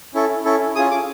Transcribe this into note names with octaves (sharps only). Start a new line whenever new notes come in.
C#4 E4 A4
C#4 E4 A4
C#4 F4 G#4 D#6
D6